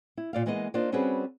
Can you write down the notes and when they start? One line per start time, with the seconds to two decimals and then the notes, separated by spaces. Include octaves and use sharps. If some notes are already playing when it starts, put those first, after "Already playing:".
0.17 E4
0.33 A#2 D5 F5
0.46 E3 G#3 A#3 B3 D5 D#5
0.74 A#3 D4 D#4 F4 C5
0.92 G3 C4 C#4 F#4 G#4 B4